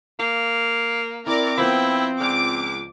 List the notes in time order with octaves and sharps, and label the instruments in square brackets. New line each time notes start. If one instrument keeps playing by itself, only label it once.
[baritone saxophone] A#3 [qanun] F5 D6
[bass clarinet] C4 [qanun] E4 [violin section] A#4 D5 D6
[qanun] F3 B3 [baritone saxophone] E4 [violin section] G5
[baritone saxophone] C#2 [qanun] D5 [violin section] D6